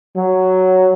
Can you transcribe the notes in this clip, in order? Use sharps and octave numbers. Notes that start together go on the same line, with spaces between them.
F#3